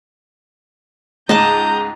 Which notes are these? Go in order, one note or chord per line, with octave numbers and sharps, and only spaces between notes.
C#2 G#2 D#5 A5 A#5 D6 D#6 G6